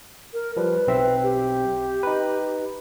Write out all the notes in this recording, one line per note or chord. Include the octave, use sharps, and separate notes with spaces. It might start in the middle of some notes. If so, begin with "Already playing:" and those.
A#4
F3 G3 B4
B1 C4 E5
G4
D#4 B4